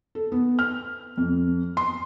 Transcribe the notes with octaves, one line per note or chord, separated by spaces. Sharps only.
A4
B3
F6
F2
C6